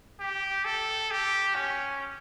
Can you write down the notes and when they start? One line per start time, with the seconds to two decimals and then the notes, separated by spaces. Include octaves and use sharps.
0.20 G4
0.65 A4
1.11 G4
1.55 C#4